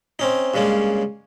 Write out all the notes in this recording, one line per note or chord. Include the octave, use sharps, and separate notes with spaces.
C4 C#4 D#4
G2 C#3 G#3 A#3 C#4